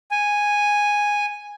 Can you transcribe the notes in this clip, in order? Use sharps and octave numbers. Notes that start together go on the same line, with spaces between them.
G#5